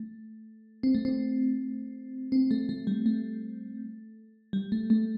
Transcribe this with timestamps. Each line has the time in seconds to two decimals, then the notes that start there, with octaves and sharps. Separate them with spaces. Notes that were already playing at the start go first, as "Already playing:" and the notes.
Already playing: A3
0.83 C4
0.95 A3
1.05 C4
2.32 C4
2.51 A3
2.69 A3
2.87 G3
3.06 A3
4.53 G3
4.72 A3
4.90 A3